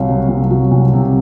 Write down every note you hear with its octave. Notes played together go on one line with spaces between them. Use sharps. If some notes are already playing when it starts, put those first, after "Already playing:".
Already playing: C2 F#3 C#5 F5
C3
C2
F#3
C2
C3